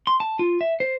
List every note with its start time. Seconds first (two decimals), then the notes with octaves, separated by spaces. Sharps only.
0.07 C6
0.20 A5
0.39 F4
0.61 E5
0.80 C5